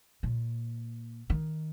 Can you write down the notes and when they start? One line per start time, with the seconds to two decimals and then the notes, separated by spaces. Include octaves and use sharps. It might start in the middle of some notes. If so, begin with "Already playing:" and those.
0.23 A#2
1.30 D#3